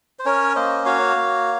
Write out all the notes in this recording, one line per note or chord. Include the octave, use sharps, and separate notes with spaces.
C5
C#4 A#4 C#5
A#3 C5 D#5
F#4 C#5 F5
A#3